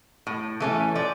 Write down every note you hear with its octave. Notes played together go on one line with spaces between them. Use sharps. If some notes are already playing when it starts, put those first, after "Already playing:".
A2
E3 A3 C#4
F3 D5